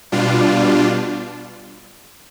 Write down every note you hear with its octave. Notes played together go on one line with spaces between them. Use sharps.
B2 G3 D4 F4